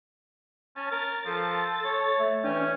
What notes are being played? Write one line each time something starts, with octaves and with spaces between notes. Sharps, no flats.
C#4 A5
A#4 A6
F3 A4
C#5
A3
E3 C#4 D4 G5